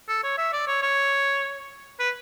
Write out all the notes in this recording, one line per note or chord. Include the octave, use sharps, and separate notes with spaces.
A4
C#5
E5
D5
C#5
C#5
B4